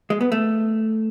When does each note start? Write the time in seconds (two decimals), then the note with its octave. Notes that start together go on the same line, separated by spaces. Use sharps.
0.10 G#3
0.21 B3
0.32 A3